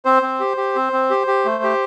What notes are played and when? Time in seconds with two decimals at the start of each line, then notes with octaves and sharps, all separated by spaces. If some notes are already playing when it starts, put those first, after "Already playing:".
0.05 C4 C5
0.22 C4
0.40 G4
0.57 G4
0.76 C4
0.93 C4
1.10 G4
1.27 G4
1.45 A3
1.63 G4